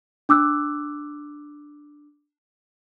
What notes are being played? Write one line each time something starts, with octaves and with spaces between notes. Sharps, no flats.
D4 D6 E6 F#6